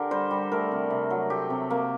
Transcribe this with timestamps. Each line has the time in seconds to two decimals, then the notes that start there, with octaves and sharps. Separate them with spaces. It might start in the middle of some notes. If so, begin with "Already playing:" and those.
Already playing: D3 G4 A#4
0.11 G3 C5
0.31 G3
0.52 A3 A#4
0.71 C3
0.90 C3
1.10 F#3
1.30 A3 G4
1.50 C3
1.70 C3 A#3